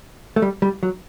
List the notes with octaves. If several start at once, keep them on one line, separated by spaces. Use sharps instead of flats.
A3
G3
G3
F#3